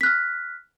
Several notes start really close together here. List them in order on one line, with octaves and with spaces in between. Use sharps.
B6 F#6 F6